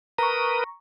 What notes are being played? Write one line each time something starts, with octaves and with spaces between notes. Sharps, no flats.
A#4 B4 A#5 C#6 D#6